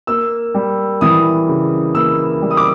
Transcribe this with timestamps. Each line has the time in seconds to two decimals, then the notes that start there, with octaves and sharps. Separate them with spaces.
0.07 A#3 E6
0.54 G3
1.01 E3 D#6
1.49 C#3
1.95 A#3 E6
2.42 G3
2.50 D#6
2.57 D6